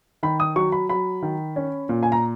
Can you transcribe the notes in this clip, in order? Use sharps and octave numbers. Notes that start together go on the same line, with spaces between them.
D#3 B5
D#6
F#3 C#6
B5
F#3 B5
D#3
C#4
A#2
G#5
A#5